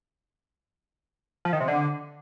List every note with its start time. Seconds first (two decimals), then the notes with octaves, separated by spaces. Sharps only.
1.45 F3
1.53 D#3
1.60 C3
1.68 D3